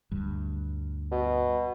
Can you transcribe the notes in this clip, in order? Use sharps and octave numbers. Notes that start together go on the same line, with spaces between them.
D2 G2
B2